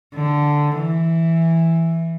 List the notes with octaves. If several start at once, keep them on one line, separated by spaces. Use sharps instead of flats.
D3
E3